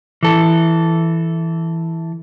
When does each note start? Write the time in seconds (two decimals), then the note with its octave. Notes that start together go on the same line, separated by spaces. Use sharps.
0.23 E3 A4